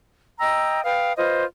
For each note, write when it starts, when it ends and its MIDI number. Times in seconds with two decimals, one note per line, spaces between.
0.39 0.81 75
0.39 0.81 79
0.39 0.81 82
0.39 0.81 88
0.84 1.13 71
0.84 1.13 77
0.84 1.13 79
0.84 1.13 87
1.17 1.44 65
1.17 1.44 71
1.17 1.44 72
1.17 1.44 75